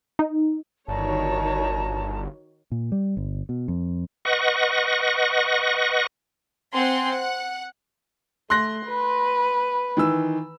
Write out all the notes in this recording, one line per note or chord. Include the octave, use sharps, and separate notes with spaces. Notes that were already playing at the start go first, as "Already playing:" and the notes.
D#4
G1 D#3 F#4 C#5 D5 A5 A#5
A#2
G3
G1
B2
F2
B4 D#5 F#5 C#6 A#6
C4 F#5 G#5 C6
F#5
A3 C6 F#6 A#6
B4
D#3 E3 E6